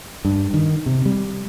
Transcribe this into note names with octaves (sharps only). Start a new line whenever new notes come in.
G2
D#3
C3
G3